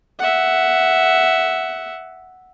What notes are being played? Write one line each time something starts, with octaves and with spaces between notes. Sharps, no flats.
E5 F#5